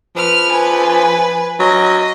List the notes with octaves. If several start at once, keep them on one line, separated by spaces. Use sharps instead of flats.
F3 B4 F6
B4 G#5
F#3 D#5